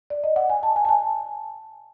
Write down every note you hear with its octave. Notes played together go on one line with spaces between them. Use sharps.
D5
D#5
F#5
G#5
A5
G#5
A5
G#5